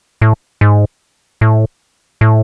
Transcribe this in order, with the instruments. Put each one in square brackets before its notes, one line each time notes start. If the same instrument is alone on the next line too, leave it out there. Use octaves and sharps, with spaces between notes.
[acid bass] A2
G#2
A2
A2